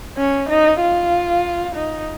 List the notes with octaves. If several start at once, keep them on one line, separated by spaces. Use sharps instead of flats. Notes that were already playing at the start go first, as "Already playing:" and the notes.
C#4
D#4
F4
D#4